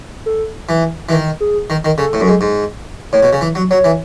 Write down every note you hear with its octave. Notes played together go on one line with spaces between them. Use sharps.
A4
E3
E3
D#3
G#4
D#3
D#3
C#3 A4
A2
F#2
G#2
G#2
A2 C#5
B2
C#3
E3
F#3
F#3 C#5
E3